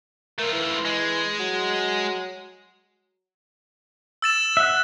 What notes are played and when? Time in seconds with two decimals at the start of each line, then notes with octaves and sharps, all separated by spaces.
0.39 A3 F4 A#4
0.53 E3
0.85 G#3
1.39 F#3
4.22 E6 A6 E7
4.57 E5 F#5